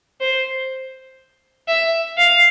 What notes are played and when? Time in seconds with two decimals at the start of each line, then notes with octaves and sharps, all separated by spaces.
0.20 C5
1.68 E5
2.17 F5